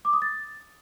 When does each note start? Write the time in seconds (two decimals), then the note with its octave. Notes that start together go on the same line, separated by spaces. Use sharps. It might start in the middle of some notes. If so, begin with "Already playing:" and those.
0.05 D6
0.13 D#6
0.22 A6